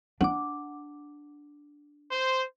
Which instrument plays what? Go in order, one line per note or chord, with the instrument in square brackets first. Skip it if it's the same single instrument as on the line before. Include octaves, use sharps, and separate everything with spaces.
[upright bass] D4 [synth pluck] F#5 D6
[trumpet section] C5